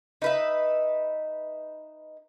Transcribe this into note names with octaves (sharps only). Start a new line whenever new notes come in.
D#4 B4 E5